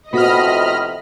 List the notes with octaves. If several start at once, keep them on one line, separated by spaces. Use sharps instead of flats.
F2 A2 C3 B3 F#4 D#5 B5 F6